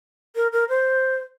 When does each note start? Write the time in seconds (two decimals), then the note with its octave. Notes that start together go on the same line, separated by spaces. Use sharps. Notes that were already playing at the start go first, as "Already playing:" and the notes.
0.36 A#4
0.52 A#4
0.69 C5